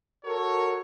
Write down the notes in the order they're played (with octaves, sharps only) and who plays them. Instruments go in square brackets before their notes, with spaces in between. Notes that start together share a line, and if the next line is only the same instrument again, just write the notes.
[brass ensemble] F#4 A4 A#4 C#5